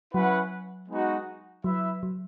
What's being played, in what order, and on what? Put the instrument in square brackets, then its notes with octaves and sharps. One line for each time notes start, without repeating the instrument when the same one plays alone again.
[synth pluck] F#3 [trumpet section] C#4 E4 B4 F#5
[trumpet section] G#3 B3 D#4 F#4
[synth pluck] F#3 [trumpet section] E4 B4 E5
[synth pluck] F#3